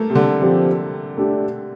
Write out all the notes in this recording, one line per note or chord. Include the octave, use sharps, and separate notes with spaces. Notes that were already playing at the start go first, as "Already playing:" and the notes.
Already playing: A3 A#3
C3
D3
F3 C4 G4
A3 D4 G4